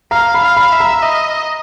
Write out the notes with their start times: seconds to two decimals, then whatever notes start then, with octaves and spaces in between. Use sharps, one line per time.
0.11 F5 A#5
0.34 B5
0.42 F5
0.57 B5
0.72 E5
0.80 A#5
1.02 D#5